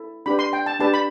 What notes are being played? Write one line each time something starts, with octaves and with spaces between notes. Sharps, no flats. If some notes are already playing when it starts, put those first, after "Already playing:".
Already playing: E4 A4
D4 G4 B4 B5
C6
G5
A5
D4 G4 B4 A5
B5